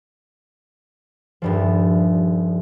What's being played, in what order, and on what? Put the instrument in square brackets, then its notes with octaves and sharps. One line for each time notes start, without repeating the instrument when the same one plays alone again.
[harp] D#1 G2 F3